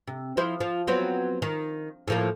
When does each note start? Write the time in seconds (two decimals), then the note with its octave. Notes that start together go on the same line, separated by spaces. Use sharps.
0.07 C3
0.37 F3 E4 C5
0.60 F3
0.87 F#3 B3 C4
1.42 D#3
2.08 A2 F3 A#3